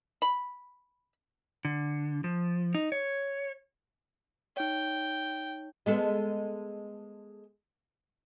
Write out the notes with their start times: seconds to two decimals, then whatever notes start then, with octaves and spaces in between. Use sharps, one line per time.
0.22 B5
1.65 D3
2.24 F3
2.74 D#4
2.92 C#5
4.57 D#4 C#5 G5
5.86 G#3 B3 A4